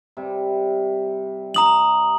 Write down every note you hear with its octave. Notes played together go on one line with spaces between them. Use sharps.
C3 G3
A#5 D#6 F#7